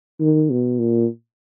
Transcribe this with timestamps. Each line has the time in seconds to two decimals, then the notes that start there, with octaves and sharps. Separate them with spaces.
0.20 D#3
0.50 B2
0.79 A#2